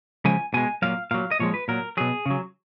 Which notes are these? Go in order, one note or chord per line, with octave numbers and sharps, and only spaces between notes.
C#3 F3 G#3 G#5
B2 G#3 G#5
A#2 F#3 F5
A#2 F#3 F5
D#5
A#2 F3 G#3 C#5
B4
A#2 F#3 A#4
B2 F#3 G#4
C#3 F#3